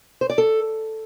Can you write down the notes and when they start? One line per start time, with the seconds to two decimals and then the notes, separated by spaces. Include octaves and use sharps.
0.21 C5
0.30 D5
0.38 A4